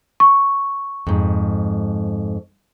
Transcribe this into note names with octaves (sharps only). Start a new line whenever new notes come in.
C#6
F2 G#2